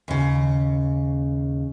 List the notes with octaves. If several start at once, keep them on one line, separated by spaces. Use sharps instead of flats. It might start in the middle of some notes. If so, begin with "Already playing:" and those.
D#2 C#3